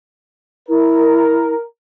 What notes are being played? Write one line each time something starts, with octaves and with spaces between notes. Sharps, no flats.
E4 A#4